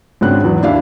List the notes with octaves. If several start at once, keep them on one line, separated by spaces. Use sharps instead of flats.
G#1 C#3 C4 D4 F#6
E2 F#3
D#2 D4 E4 F5